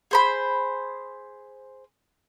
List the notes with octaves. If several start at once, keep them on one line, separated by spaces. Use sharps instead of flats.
G#4 C5 B5